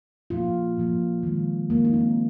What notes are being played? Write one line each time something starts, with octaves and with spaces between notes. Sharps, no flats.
A#2 F3 A#3 F4
A#2 F3 A#3
D#3 G#3
D#3 G#3 A#3
D#4
C4